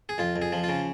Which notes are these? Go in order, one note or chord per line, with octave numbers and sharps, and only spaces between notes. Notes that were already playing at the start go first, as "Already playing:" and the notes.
G#4
F2 F4
F2
G#4
F3
F4
C#3